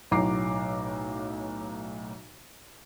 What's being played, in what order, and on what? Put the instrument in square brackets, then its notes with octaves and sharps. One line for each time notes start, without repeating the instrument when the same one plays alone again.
[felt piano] B1 A2 F#3 A#5 D6 C7